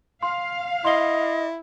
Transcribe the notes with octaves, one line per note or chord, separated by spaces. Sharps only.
F5 C6
E4 D#5 C6 G7